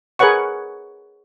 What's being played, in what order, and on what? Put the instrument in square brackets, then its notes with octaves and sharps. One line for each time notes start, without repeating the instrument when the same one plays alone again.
[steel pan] G#4 A#4 B4 C#5 F#5 C#6